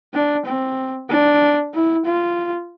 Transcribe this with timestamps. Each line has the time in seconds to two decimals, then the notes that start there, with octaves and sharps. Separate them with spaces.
0.14 D4
0.46 C4
1.10 D4
1.74 E4
2.06 F4